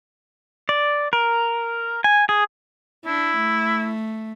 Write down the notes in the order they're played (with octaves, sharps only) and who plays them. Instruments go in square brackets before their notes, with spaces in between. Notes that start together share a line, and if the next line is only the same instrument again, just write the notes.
[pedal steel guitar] D5
A#4
G#5
G#4
[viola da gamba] D4 [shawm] E4
[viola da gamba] A3